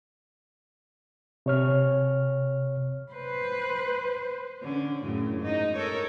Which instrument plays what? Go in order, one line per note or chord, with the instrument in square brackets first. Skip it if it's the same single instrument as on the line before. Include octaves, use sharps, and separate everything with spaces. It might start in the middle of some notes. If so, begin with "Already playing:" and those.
[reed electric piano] C3 C#5 F6
[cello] B4 C5
[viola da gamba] D3 C#4
F#2 A2 C#3
G#2 D#4
A4 A#4 C#5